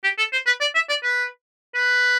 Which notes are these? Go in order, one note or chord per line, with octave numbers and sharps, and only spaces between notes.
G4
A4
C5
B4
D5
E5
D5
B4
B4